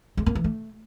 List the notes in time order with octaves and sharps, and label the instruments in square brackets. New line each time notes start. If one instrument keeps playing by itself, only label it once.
[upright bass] G#3
A#3
E3
A3